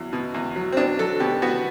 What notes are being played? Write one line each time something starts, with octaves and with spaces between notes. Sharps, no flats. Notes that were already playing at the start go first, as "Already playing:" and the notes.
Already playing: E2 F#3
B2
E2
F#3
C4
B2 D4
F#3 A4
B2 G4
B3 F#4